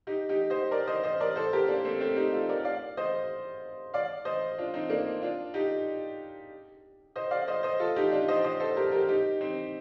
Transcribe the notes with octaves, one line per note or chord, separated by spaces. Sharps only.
D#4 G4
D#4 G4
C5 D#5
A#4 D5
C5 D#5
C5 D#5
A#4 D5
A4 C5
G4 A#4
A#3 D4
A3 C4
A3 C4
D#4 G4
F4 A4
A#4 D5
D5 F5
C5 D#5
D5 F5
C5 D#5
D4 F4
C4 D#4
A#3 D4
D4 F4
D#4 G4
C5 D#5
D5 F5
C5 D#5
C5 D#5
F4 A4
D#4 G4
D4 F4
C5 D#5
C5 D#5
A4 C5
G4 A#4
G4 A#4
D#4 G4
C4 D#4